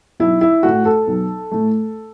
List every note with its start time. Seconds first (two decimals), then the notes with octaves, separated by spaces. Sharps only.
0.20 B1 E4
0.41 E4
0.63 A2 A3 F#4
0.85 A4
1.08 B1
1.51 A2 A3